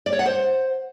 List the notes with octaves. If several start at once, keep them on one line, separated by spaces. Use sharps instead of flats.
D5
C#5
F#5
C5